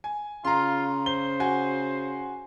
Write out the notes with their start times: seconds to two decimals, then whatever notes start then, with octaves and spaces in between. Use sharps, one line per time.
0.04 G#5
0.45 C#3 F4 A#5 C6
1.06 C5 G7
1.40 F#4 G#5